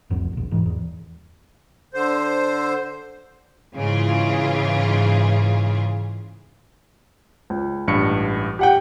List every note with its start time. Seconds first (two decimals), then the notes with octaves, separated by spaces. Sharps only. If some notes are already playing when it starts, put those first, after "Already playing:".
0.10 F1 C2 F2
0.33 D#1 A#1
0.51 E1 G#2 E3
0.66 E2
1.94 D3 C5
3.76 G#2 C#3 E3 F4 G#4
7.50 C#2
7.87 A1 G2 C#7
8.59 G4 F#5 G5